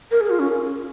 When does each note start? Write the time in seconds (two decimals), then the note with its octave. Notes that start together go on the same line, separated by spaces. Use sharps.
0.11 A#4
0.21 G#4
0.30 F4
0.39 C#4